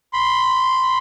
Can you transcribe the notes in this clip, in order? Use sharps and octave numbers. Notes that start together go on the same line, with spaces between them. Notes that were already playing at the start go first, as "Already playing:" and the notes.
B5 C6